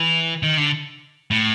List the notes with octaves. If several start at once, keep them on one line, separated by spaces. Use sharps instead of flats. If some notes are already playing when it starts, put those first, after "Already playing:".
Already playing: E3
D#3
D3
A2